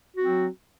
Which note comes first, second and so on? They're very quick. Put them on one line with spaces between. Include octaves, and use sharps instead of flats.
F#4 C4 F#3